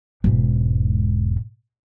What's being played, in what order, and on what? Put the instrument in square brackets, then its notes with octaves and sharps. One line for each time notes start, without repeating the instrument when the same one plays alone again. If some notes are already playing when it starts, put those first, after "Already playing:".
[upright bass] E1 G#2